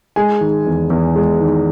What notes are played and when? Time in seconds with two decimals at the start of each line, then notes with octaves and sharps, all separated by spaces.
0.16 G#3 G#5
0.41 D#3
0.66 E2
0.90 E2
1.16 G#3
1.40 D#3